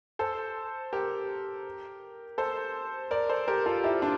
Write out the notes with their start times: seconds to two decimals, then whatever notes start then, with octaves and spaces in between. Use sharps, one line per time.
0.19 A4 C5
0.93 G4 A#4
2.38 A4 C5
3.11 A#4 D5
3.29 A4 C5
3.48 G4 A#4
3.66 F4 A4
3.84 E4 G4
4.02 D4 F4